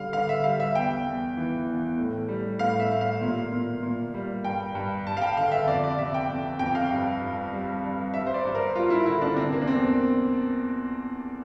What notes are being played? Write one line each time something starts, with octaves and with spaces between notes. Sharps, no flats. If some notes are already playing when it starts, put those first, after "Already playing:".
Already playing: D3 G3 F5
D3 F5
E5
G3 F5
E5
E2 G5
E2
E3
E2
A2
G3
A2 F5
E5
A2
F5
A#2
A#2
A#2
G3
G2 G5
G2
G2 A5
F5
G5
D3 F5
E5
F2 D5
D5
C3 E5
G5
F2
F2 G5
F5
G2
G2
G3
G2
G2 E5
C5
D5
G2
A#4
G3 F4
E4
D3 E4
D4
C3 C4
A#3
D4
E2 C4